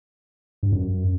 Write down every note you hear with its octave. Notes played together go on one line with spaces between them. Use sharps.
G2
F#2